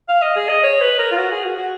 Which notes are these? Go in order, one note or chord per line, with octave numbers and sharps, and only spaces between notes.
F5
D#5
G#4
D#5
C#5
B4
A#4
F4
F#4
G#4
F#4
F#4